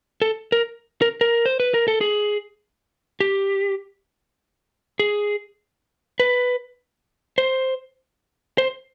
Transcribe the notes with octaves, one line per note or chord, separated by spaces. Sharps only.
A4
A#4
A#4
A#4
C5
B4
A#4
A4
G#4
G4
G#4
B4
C5
C5